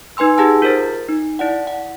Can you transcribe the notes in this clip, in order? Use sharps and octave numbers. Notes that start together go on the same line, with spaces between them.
D#4 B4 G#5 C6 E6
D#4 G4 G#4 F#5 A5 E6
F4 A#4 C5 A6
D#4
E4 D5 F#5
F#5